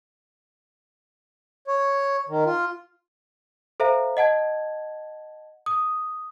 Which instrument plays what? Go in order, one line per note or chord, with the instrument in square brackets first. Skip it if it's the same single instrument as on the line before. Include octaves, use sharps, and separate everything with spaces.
[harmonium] C#5
D#3
F4
[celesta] A4 C5 E5 F5 A#5
D#5 F#5 A5 G#6
D#6